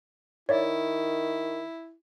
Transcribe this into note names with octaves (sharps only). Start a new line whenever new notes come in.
D#3 E4 C#5 D5 E5